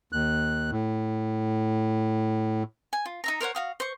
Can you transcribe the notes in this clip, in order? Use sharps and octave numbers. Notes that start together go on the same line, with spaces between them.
D#2 F#6
A2
G#5
F4
D#4 E5 A#5
A#4 C5 C#5 F#5
F#4 F5 D#6
C5 C#6